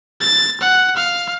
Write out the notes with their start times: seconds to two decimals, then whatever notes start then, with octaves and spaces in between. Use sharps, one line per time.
0.21 A6
0.61 F#5
0.97 F5